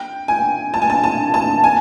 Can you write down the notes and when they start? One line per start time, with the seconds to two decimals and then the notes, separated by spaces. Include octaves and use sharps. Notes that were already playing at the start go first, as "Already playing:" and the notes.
Already playing: G5
0.28 G#5
0.74 A5
0.82 G#5
0.90 A5
1.04 A5
1.34 A5
1.64 G#5